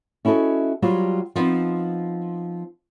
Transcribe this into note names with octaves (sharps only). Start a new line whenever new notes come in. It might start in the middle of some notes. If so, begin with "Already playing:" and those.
C#4 E4 F#4 A4 D#5
F#3 G3 F4 F#4 C5
F3 B3 C4 D#4